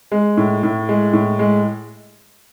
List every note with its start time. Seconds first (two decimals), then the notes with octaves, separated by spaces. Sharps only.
0.12 G#3
0.37 A2
0.63 A2
0.89 G#3
1.13 A2
1.39 G#3